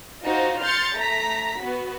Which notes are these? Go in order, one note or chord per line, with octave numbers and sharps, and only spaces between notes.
D#4 F4 F#4 C5
C6 F6 G6 A6 C#7
A3 A#5 B6
B3 F#4